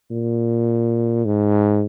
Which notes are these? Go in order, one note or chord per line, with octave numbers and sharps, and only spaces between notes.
A#2
G#2